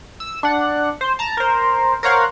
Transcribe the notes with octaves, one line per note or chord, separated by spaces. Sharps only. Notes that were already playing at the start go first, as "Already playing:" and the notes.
E6
D4 F#5
C5
A5 A#5
A#4 C5
A#4 C5 C#5 F5 F#5